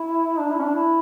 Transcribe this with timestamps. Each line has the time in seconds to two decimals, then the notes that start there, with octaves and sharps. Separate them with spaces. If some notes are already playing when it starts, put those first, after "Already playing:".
Already playing: E4
0.39 D4
0.52 E4
0.59 C#4
0.63 D4
0.75 E4